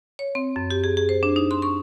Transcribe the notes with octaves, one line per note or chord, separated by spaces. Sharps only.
C#5
C4
F#2
G4
G#4
G#4
C5
D4
D#4
C6
C#6